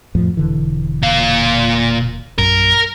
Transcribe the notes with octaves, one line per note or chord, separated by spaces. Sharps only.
F2 A2 F3
E1 D3 E3
A#2 F5
A#1 F#2 A#4